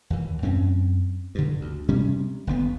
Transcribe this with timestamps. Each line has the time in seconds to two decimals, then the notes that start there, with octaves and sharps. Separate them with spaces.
0.10 D#2 E3
0.42 F#2 C4 C#4
1.35 G2 D3
1.61 D2
1.89 C3 G3 C#4
2.47 G1 D#2 B3